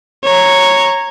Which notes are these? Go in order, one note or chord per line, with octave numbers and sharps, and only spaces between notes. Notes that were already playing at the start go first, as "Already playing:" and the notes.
C#5 A#5